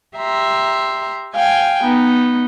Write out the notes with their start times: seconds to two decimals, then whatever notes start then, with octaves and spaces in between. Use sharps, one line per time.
0.16 G4 E5 A#5 C6
1.35 F5 G5 G#5
1.80 B3 D#4